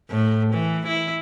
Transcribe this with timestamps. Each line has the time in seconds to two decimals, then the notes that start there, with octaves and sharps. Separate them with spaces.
0.11 A2
0.54 E3
0.88 E4